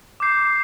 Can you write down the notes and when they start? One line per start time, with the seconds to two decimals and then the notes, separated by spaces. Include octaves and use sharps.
0.20 D6 G6 C7